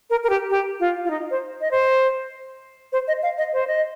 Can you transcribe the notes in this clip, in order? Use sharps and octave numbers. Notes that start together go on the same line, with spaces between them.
A#4
A#4
G4
G4
F4
F4
D#4
C5
D#5
C5
C5
D#5
F5
D#5
C5
D#5